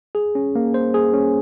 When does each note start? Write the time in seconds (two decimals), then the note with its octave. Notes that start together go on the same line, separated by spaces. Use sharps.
0.15 G#4
0.35 C#4
0.55 A#3
0.74 C5
0.94 G#4
1.14 C#4